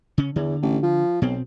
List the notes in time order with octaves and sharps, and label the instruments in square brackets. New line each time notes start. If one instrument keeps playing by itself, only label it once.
[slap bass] C#3 C#4
[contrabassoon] E2 [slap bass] D3
[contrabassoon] A1
F3
[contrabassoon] B1 [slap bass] B2 C4